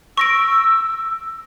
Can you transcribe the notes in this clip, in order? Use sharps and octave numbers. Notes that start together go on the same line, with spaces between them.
C#6 E6 A#6 D7